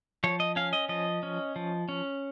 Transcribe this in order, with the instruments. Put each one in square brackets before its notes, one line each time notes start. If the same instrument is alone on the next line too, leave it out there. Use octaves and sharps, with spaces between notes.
[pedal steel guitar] F3 C#5
D#5
C#4 F5
D#5
F3 D#5
C#4
F3
C#4